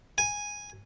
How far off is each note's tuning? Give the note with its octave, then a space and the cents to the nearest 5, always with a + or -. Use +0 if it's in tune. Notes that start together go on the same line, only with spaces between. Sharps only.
G#5 -5